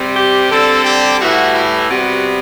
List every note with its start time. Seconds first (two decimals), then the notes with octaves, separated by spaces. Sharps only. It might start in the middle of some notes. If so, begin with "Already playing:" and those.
Already playing: C3 G3 C4
0.15 G4
0.50 D3 G3 C4 A4
0.85 G4
1.20 A2 E3 G3 F#4
1.54 E4
1.89 C3 G3 B3 F#4